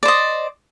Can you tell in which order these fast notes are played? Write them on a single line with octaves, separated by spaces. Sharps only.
D5 C5 D#5